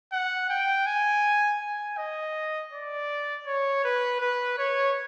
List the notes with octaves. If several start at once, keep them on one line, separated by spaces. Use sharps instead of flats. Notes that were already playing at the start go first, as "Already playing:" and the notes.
F#5
G5
G#5
G#5
D#5
D5
C#5
B4
B4
C#5